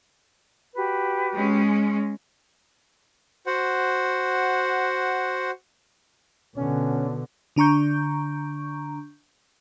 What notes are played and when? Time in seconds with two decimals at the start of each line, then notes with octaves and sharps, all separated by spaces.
0.75 F#4 G4 B4
1.34 G#3 C#4
3.46 F#4 C5 F#5
6.57 B2 D3 C#4
7.56 D3 D4 A#5 C#6 G6